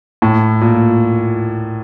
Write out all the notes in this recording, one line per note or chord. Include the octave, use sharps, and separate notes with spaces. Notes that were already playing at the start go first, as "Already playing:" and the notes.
A2
A#2